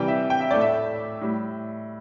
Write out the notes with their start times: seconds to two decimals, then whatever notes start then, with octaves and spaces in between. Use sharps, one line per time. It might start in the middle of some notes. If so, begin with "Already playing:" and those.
Already playing: C3 E3 G3 G5
0.08 E5
0.30 G5
0.41 E5
0.51 A2 A3 D5
0.61 E5
1.21 A2 G3